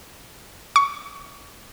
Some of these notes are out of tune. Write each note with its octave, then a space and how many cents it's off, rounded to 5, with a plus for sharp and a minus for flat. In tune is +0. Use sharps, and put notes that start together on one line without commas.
C#6 +20